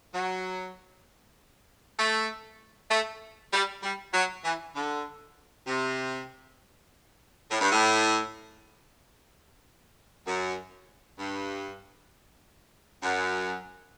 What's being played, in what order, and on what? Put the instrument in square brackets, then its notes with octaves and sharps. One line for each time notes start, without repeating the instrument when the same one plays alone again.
[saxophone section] F#3
A3
A3
G3
G3
F#3
E3
D3
C3
A2
G2
A2
F#2
G2
F#2